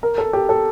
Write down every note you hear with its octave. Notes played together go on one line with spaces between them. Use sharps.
A#4
A4
G4
A4